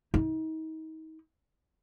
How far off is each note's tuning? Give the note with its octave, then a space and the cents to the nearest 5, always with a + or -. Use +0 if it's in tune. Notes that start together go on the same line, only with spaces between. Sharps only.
D#4 +35